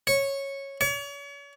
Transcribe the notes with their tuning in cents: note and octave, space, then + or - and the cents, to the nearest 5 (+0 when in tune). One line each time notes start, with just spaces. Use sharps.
C#5 -10
C#5 +40